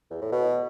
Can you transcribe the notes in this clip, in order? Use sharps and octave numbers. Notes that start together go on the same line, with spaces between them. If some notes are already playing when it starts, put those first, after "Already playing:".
E2
A2
B2